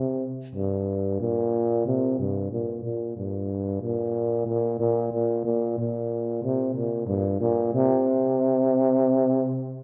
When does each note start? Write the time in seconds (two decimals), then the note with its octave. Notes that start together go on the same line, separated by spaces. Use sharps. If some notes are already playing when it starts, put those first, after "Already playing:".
Already playing: C3
0.55 G2
1.21 A#2
1.86 C3
2.19 G2
2.52 A#2
2.84 A#2
3.17 G2
3.82 A#2
4.47 A#2
4.80 A#2
5.13 A#2
5.45 A#2
5.78 A#2
6.43 C3
6.75 A#2
7.08 G2
7.41 A#2
7.74 C3